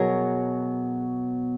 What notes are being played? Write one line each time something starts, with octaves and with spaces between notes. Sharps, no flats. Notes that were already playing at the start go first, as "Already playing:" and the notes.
Already playing: B2 F#3 B3 G#4 A#4